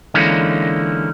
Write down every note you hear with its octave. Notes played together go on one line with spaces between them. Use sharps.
D3 E3 G#3 A#3 C#4 D#4